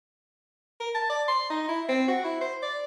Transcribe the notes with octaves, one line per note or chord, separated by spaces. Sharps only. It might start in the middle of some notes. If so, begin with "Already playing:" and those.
A#4
A5
D5
C6
D#4
E4
C4
F#4
E4
C5
D5